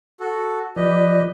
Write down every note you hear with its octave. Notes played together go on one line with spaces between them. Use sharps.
F#4 A4
F3 G4 B4 D5 D#5